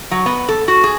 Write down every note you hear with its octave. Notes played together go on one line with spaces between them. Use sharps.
F#3
B3
A4
F#4
G#4